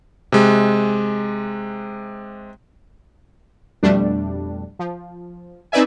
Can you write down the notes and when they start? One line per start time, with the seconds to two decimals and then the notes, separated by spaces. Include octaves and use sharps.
0.32 C3 G#3
3.83 F2 B2 G3 A3 D4
4.79 F3
5.72 C4 D#4 B4 D5 E5 G#5